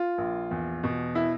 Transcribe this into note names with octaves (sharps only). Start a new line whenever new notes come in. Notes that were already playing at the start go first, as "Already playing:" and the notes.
Already playing: F4
A#1
E2
B2
E4